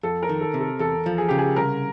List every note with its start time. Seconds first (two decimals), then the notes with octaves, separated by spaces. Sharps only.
0.03 F2 A4
0.23 A#4
0.29 D#3
0.41 A4
0.54 C3
0.61 A4
0.79 E2 A4
1.06 F3
1.18 G#4
1.29 C#3 G4
1.38 G#4
1.56 C2 A#4